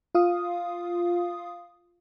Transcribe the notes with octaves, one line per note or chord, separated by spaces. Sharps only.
F4 F5 D#6